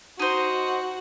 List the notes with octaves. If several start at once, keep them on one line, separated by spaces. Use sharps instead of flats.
D#4 F#4 C5